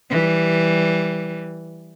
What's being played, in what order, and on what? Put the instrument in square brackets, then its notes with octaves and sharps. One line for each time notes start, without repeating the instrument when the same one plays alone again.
[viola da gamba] E3 G3